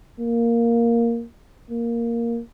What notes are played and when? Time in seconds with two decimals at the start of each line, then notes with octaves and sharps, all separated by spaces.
0.20 A#3
1.70 A#3